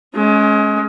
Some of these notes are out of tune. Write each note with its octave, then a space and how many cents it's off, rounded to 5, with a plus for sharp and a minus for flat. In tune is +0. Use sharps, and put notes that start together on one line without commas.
G#3 +30 C#4 +0